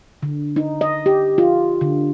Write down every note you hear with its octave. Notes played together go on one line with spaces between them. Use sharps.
D3
D#4
D#5
G4
F4
D3